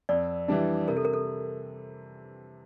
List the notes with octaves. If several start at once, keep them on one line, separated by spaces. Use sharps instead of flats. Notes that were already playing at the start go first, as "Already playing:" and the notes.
F2 D5
E3 G3 D4
C3 A#4
A4
A#4
A4